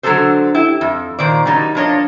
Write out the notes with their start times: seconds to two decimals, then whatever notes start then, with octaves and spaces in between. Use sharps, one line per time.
0.03 D3 F#3 G#3 G#4 A4 C5
0.55 E4 G4
0.81 F2
1.19 A#2 D#3 C5 D5
1.45 D#3 F#3 G3 D#4
1.75 F3 A#3 D4 C#5 D#5